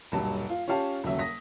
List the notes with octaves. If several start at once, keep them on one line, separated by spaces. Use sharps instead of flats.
D#1 B1 G2 A5
F4
C#4 F4 G4 F5 A5
D#1 C#3 F#3 E5
D#6 A#6 B6